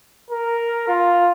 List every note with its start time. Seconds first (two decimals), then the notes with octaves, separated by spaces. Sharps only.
0.30 A#4
0.88 F4